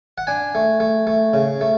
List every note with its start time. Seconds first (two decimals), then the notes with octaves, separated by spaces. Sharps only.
0.18 F#5
0.27 D4 G#5
0.55 A3
0.80 A3
1.07 A3
1.33 C#3
1.61 A3